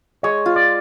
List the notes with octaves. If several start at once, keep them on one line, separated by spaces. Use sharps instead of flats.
G#3 C#5
F4
D5